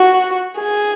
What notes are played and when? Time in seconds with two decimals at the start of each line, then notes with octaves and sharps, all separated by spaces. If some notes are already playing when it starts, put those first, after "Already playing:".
Already playing: F#4
0.58 G#4